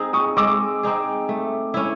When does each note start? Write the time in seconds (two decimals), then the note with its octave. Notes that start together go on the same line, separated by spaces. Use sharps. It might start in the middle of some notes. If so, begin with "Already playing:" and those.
Already playing: C4 D#4 G#4
0.13 C#6 D#6
0.37 G#3 D6 E6
0.83 C4 D#4 G#4
1.29 A3
1.74 C#4 E4